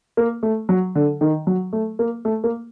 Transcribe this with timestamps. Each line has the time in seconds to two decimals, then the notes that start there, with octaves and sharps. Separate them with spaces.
0.17 A#3
0.43 A3
0.69 F#3
0.95 D3
1.21 D#3
1.47 F#3
1.73 A3
1.99 A#3
2.25 A3
2.44 A#3